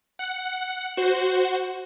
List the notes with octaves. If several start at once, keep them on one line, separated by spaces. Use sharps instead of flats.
F#5
F#4 C5